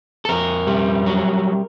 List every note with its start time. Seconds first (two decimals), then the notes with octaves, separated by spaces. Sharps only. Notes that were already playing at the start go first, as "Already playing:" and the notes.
0.25 A4
0.29 F2 A#4
0.67 G3
1.06 F#3